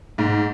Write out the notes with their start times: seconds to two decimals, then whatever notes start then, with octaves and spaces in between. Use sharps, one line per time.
0.18 G#2